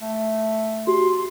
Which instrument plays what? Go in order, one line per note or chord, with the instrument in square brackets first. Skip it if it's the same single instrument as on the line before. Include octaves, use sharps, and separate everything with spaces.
[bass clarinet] A3
[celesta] F#4 G4 [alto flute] C6